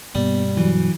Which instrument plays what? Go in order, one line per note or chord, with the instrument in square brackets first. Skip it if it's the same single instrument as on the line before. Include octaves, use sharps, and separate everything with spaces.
[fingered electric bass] G2 B2 A#3 [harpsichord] G3 [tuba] B3
[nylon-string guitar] E3 [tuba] F#3